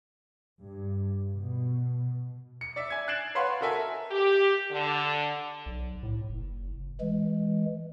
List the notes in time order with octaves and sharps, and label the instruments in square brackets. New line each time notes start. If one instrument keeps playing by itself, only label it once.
[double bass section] G2
B2
[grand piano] C#7
D5 E5
G#5 G#6
F#6 A6 C7 D7 E7 F#7
B4 C#5 F5 F#5 C6
F#4 A4 A#4 E5 G#5
[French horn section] G4
D3
[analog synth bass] B1
A2
F#1
[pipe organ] E3 G#3